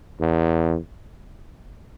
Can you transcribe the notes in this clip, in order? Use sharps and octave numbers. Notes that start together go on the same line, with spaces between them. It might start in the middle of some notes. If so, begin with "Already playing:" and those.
E2